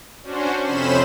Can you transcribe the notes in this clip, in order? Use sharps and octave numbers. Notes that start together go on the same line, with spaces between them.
C#4 D4 F#4 C5
F2 C3 C#4 C5 B5 E7